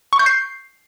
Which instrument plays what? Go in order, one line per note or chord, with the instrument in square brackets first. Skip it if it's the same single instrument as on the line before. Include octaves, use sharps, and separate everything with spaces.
[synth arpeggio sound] C#6
G6
C7